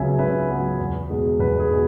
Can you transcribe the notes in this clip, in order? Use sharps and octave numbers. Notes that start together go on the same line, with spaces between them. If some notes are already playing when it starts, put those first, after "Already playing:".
Already playing: C#2 C#3 F#3 B3 E5 G#5
C#2 B4 E5
C#3 F#3 B3
E2
B2 G#3
E2 B4
G#4
B2 G#3